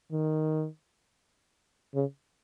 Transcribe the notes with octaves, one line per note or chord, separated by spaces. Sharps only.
D#3
C#3